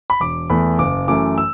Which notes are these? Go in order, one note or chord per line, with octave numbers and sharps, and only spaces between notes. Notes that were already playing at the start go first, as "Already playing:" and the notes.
B5
E1 D6
E2 E3 A3 B5
F#1 D6
F#2 E3 A3 D6
E6